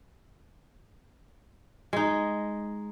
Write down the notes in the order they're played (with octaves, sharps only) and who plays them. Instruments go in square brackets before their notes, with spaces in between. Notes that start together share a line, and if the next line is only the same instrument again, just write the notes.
[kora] G#3 D#4